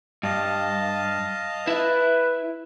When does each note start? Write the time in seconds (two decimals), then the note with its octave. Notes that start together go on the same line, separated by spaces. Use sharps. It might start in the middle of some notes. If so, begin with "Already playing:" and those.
0.23 G2 D#5 F5 A5
1.67 E4 B4 E5